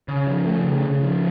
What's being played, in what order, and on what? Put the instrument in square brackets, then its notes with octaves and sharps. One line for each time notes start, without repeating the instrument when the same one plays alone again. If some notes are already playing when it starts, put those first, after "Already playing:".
[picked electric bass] C#3
F3
A3
C#3
C#3
F3